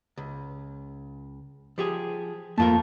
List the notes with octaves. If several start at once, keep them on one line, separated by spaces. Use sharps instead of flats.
C#2
F3 G4 G#4
F2 A3 A#3 F4 A#4 A5